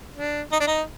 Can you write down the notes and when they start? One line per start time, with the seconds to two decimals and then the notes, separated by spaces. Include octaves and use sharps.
0.16 D4
0.52 D#4
0.60 D4
0.67 D#4